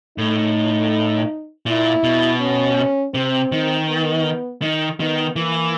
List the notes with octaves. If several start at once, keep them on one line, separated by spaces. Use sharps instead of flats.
A2 D#4
A#2 E4
B2
C#4
C3 C4
D#3
B3
D#3
D#3 B3
E3 A#3